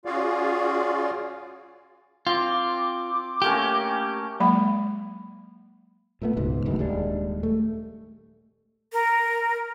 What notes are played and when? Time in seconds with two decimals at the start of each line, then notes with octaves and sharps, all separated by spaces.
0.05 C#4 F4 F#4 G#4 D5 F5
2.27 C4 F4 D6
3.42 A3 A#3 C#4 G4
4.40 F#3 G#3 A#3 B5
6.22 A#2 A3 B3
6.37 C#2 G#2 B2
6.65 F#1 D2 D#3 E3
6.79 D#1 G3 G#3 D4
7.43 A3
8.93 A#4